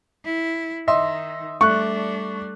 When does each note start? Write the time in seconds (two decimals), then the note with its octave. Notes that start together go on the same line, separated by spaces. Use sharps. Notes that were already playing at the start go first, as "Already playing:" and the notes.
0.24 E4
0.88 D#3 D#4 D#5 E5 C6
1.61 G3 A3 D4 C#6 F#6